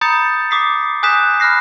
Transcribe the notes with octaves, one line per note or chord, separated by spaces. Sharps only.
A#5 B5 D#6 G6 A6 C#7
D6 D#6 B6 C7
G#5 D#6 F#6 G6 B6 E7
B5 F6 F#6 A#6 C7